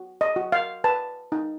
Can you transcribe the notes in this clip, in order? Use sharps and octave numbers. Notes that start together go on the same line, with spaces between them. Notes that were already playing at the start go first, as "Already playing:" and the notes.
Already playing: F#4
D#5
F#4
F5
B4 A5
D#4